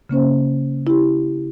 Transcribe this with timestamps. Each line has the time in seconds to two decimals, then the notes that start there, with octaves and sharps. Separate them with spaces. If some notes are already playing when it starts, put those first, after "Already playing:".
0.09 C#3 A#3 C#4 C5
0.87 E4 G4